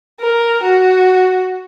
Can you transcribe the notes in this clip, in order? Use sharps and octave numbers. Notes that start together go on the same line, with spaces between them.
A#4
F#4